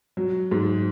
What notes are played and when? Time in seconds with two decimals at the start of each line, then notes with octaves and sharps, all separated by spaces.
0.17 F#3
0.51 G#2